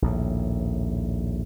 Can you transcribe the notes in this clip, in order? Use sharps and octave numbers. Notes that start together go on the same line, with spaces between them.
A#1 D#2 A2